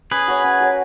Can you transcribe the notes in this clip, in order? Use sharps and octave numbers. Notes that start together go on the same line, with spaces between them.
C#4 G#4 B4
F#4 A#4 C#5
C#4
F#4 A#4 C#5